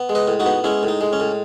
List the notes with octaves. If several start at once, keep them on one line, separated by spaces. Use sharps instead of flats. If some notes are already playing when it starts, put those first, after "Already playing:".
Already playing: B3
G#3
B4 D#5
A2
D#4 F#4
B3
G#3 C#4 E4
A2
D#4
G#3
C#4
A2